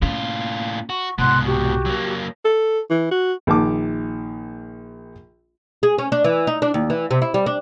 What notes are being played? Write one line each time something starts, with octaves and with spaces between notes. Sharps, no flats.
A2 A#3 C#4 F4
F#4 C#6
C2 G#2 B2 F#5 C6 F#6
F#4 G4
F#3 A#3
A4
E3
F#4
A#1 D#3 A5 D6
G#4
C#4
D4
E3
D#4
D4
D#2
E3
C3
E4
G3
D4